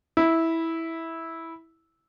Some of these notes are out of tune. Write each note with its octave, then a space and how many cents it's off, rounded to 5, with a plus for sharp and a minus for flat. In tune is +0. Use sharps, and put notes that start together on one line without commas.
E4 -10